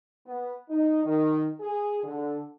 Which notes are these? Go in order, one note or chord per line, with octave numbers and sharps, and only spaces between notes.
B3
D#4
D#3
G#4
D3